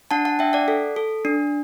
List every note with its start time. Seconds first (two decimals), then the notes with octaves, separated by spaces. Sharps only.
0.11 D4 F#5 A5
0.25 F#5 A5
0.39 D4 E5 G5
0.53 D5 F#5
0.68 A4
0.96 A4
1.25 D4